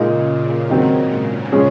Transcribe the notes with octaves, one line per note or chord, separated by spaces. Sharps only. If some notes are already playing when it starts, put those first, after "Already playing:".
Already playing: A#2 C#3 G#3 D#4
A#2
G#2 D#3 F#3 C4 D#4
F3 G#3 C#4 G#4